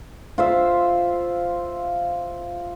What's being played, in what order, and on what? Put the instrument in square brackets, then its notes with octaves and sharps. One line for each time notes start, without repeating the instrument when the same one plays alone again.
[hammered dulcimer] F4 C5 E5